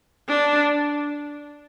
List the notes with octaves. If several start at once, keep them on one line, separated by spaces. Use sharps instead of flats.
D4